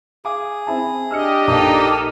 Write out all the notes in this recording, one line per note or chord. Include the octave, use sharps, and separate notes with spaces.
G#4 F5 G#5 D6
C4 E4 A5
D4 G4 D#5 E6 F6 C#7
A#1 A#3 D#4 A4 F5 D#6